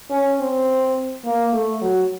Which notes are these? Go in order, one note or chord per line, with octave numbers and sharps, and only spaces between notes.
C#4
C4
A#3
A3
F#3